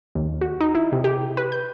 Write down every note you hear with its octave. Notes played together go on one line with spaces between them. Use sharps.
D#2
F#4
D#4
E4
C3
G4
B4
G6